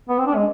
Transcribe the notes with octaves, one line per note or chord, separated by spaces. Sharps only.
B3
C4
D4
G#3